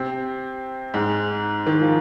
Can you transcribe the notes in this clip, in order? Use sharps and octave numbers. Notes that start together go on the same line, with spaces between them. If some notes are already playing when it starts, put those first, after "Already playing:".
Already playing: C3 C4
G#2 G#3
D#3
F3